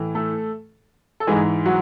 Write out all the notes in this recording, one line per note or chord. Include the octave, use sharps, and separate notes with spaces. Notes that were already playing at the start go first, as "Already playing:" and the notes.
Already playing: A2 E3
A3 A4
A4
G#2 E3 G#3 G#4
F#3 F#4